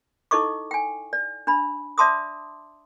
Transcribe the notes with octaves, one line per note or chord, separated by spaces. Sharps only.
D#4 E4 A4 D#5 C#6 D6
G5 G#5
D5
D4 B5
D5 E5 A5 C6 D6 D#6